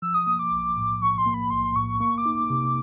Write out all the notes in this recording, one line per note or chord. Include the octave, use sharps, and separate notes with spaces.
F3 E6
D#6
A#3 D#6
D6
B1
A2
F3 C#6
C6
A#3
B5
B1 C6
C6
A2 C#6
C#6
A#3 C#6
D6
D#4
D6
C3